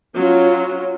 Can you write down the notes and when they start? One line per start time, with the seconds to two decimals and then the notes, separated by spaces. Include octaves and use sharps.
0.16 F#3 C#4 F4